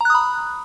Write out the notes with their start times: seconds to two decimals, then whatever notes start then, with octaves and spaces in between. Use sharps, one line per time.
0.01 A#5
0.05 F#6
0.10 D#6
0.15 B5